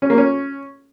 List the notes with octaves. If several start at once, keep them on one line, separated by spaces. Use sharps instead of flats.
C#4
A#3
C#4